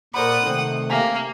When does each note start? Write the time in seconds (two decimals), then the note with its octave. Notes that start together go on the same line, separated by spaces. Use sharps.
0.14 A#2 A#4 C5 D5 F#5 B5 D#6
0.42 C3 D#3 A3 C4 F#7
0.90 A#3 G4 E5 G#5